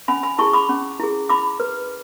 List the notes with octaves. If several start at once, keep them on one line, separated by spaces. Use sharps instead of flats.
C#4 G#5 B5
G#5 B5
E4 G#4 A5 C#6
B5 D6
C#4
E4 G#4
E4 B5 D6
B4